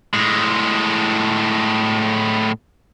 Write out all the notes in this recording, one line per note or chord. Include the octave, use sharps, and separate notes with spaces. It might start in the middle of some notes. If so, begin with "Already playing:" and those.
A2 G#3